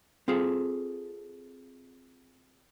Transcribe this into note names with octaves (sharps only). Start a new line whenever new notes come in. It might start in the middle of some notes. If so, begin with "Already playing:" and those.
C4 F4 G#4 A4